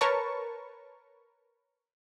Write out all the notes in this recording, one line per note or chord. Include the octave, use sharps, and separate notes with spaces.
A#4 B4 C#5 A5 C#6